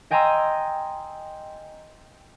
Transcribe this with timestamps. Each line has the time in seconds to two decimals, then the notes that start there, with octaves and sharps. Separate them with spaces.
0.11 D#5 G5 G#5 A#5 C6 E6